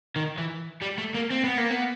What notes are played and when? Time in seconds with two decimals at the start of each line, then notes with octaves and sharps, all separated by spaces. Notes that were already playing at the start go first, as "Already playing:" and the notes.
0.16 D#3
0.38 E3
0.82 G3
0.98 A3
1.14 A#3
1.30 C4
1.44 B3
1.57 A#3
1.70 B3